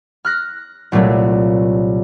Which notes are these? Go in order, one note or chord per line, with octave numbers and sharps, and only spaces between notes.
F6 F#6 A#6
C2 A#2 F#3 A3 A#3